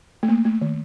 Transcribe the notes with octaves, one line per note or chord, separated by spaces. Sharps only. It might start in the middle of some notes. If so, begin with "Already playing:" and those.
A3
A#3
A3
D#3